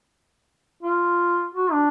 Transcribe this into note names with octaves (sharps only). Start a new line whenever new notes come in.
F4
F#4
D4